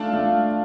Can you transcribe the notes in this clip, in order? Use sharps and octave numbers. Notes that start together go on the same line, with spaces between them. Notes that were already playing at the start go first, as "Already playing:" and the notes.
Already playing: A3 D4 F4
A3